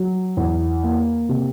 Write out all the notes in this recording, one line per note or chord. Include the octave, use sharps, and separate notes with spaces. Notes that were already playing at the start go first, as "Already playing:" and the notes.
Already playing: F#3
E2
A#3
C3